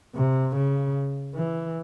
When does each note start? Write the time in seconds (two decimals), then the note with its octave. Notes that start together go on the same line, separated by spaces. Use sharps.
0.15 C3
0.56 C#3
1.35 E3